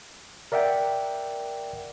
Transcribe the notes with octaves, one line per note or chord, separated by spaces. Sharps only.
A#4 D5 E5 F#5 G5